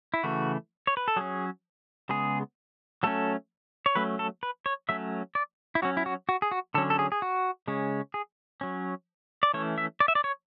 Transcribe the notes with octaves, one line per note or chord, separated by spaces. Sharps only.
E4
C#3 E3 A3 F#4
C#5
B4
A4
F#3 C#4 G#4
C#3 G#3 B3 G#4
F#3 A3 C#4 A4
C#5
F#3 A3 C#4 B4
A4
B4
C#5
F#3 A3 C#4 E5
D5
E4
F#3 C#4 F#4
E4
F#4
F#4
G#4
F#4
D3 F#3 C#4 A4
A4
G#4
G#4
F#4
C#3 G#3 C#4
G#4
F#3 C#4
D5
E3 A3 C#4 C#5
E5
D5
E5
D5
C#5